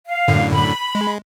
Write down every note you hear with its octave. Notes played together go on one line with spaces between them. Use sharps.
F5
F#2 A2 D3
B5
G#3